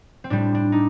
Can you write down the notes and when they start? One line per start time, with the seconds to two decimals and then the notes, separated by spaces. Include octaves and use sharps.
0.24 C4
0.30 A2 G3 D4
0.55 D4
0.72 D#4